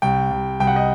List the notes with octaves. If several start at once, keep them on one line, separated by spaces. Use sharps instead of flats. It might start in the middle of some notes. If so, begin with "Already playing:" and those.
C2 G5
C2
C2 G5
F#5
D#5